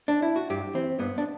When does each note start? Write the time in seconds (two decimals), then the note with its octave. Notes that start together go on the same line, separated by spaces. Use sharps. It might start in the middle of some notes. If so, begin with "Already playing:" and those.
0.08 D4
0.22 E4
0.36 F#4
0.50 G2 G4
0.74 E3 C4
0.99 G2 B3
1.18 D4